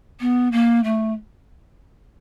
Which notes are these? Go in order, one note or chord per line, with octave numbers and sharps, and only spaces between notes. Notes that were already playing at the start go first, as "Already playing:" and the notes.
B3
A#3
A3